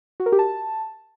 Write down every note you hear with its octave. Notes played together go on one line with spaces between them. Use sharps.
F#4
A#4
G4
A5